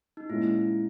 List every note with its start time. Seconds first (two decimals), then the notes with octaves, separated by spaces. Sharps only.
0.17 D#4
0.29 A#2 G#3 C#4 E4